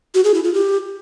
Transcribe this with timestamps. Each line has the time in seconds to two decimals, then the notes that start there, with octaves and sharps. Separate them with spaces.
0.15 F#4
0.24 G#4
0.34 E4
0.44 F4
0.54 G4